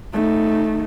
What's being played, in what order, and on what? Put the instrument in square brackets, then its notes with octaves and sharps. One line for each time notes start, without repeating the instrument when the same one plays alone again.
[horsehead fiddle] A3 D#4